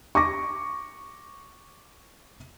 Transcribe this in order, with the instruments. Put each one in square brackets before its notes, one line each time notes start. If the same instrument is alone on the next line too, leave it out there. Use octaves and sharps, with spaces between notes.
[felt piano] C#6 D6 A#6